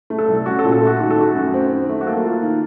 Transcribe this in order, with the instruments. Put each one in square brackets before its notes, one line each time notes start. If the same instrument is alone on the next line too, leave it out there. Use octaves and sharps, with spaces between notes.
[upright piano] A3
[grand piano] A4
[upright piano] C2
[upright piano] C#4 [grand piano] F#4
[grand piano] A4
[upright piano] A#2
[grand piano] A4
[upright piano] A3 [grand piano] F#4
[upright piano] D#3 [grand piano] F#4
[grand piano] A4
[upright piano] A3 [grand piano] F#4
[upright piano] F#2
C4
D#3
A3
[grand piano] F#4
[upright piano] A#3 [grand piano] A4
[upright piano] F4
D#3